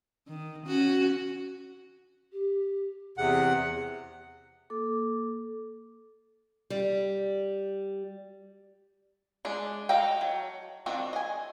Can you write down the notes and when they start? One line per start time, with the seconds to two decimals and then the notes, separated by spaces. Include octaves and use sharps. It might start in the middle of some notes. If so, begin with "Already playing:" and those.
0.27 D#3
0.67 C#4 F#4
2.33 G4
3.18 E2 C3 G#4 F#5
4.70 A#3 A4 D6
6.70 G3
9.45 G#3 D4
9.89 F#4 A4 D#5 F5 G5
10.21 F#3
10.86 D#3 F3 C4 D4 F#4
11.13 D#5 G#5